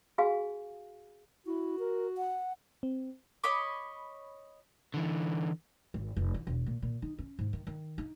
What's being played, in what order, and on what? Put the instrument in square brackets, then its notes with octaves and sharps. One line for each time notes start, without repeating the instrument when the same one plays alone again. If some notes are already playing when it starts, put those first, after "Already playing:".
[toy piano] F#4 G#4 F5 G#5
[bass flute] E4 [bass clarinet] F#4
[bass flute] A#4
F#5
[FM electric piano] C4
[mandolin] C#5 D#5 B5 D6
[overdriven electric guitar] D3 E3
[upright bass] G#1
F1
E3
E1
A#2
A#2
D#4
C#4
G#2
D#3
D#3
D#4